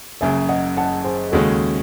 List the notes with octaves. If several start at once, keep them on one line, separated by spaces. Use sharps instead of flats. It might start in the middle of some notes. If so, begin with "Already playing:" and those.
F#1 F#2 C#3 E5 G#5
D#5 F#5
F#5 A5
G#4 C5
D#2 C#3 G#3 C#4 F#4 A4